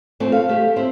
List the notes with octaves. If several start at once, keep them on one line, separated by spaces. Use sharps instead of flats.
E3 A3 C4
F5
A3 G4
C4 E4